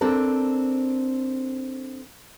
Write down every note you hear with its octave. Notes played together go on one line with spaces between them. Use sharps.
C4 D4 A4 A#4